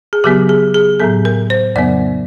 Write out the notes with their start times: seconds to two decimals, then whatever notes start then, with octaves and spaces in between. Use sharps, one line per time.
0.13 G#4
0.24 C#3 F#3 B3 G4
0.49 G#4
0.74 G#4
1.00 A2 F#3 B3 A4
1.25 A#4
1.50 C5
1.76 F2 C#3 F#3 B3 D5